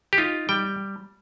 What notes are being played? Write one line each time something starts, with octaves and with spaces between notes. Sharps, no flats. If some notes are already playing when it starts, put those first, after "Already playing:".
G4
D#4 F4
G3 G5